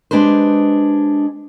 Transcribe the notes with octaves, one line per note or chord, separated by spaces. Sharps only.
G#3 D4 G4 B4 C5